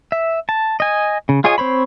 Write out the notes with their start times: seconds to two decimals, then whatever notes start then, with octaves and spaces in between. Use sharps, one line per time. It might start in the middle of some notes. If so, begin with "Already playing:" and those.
0.12 E5
0.49 A5
0.80 D#5 G#5
1.29 C#3
1.44 F4 G#4 C#5 D#5 G#5
1.58 C4 C5 C#5 B5